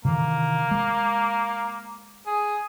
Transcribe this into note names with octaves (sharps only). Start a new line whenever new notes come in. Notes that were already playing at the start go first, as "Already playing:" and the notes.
C3 D#3 E3 A#3
G#3
G#4